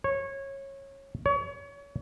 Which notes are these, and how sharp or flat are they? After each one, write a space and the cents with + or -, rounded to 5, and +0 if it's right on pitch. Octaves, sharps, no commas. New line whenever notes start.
C#5 -20
C#5 +30